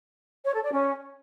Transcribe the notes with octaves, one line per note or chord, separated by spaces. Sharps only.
C#5
A4
D5
C#4